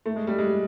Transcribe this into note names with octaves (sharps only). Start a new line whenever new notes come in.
A3
G#3
G3
G#3